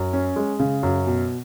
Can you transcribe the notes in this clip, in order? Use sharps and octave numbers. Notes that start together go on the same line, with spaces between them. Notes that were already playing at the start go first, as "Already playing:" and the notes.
Already playing: F#2
C#4
G#3
C#3
F#2
B2